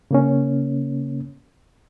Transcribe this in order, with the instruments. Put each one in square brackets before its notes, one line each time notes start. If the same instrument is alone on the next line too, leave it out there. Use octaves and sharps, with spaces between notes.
[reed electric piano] C#3 A#3 C#4